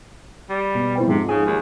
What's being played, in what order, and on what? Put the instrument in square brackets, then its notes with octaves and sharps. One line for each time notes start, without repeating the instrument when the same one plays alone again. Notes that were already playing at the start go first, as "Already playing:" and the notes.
[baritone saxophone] G3
[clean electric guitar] B2
[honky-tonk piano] A2 C4 G5
[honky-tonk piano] F2 G#2 [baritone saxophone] C3
[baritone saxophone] C#3 [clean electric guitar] G#4
[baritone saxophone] D#2